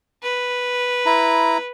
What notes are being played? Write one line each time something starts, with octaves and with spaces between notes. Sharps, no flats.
B4
E4 A#5